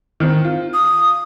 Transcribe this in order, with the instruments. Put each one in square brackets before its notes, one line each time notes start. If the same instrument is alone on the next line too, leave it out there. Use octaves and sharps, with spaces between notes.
[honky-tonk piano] D#3 C4
F4
[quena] D#6